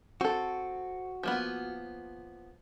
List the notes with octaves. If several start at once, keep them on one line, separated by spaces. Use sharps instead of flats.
C4 F#4 A4
F3 A#3 B3